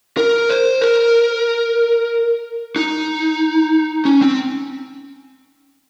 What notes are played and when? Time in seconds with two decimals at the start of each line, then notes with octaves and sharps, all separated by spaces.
0.17 A#4
0.49 C5
0.81 A#4
2.76 D#4
4.05 C#4
4.22 C4